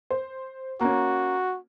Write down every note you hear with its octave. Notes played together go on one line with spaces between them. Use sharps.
C5
A#3 C#4 F#4